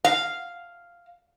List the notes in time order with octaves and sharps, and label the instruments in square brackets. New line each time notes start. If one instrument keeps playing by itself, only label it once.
[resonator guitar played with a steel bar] F5